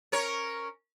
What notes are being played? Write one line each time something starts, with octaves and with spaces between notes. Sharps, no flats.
C#4 A#4 C#5